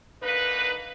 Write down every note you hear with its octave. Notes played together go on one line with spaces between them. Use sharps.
D3 A#3 D#4 B4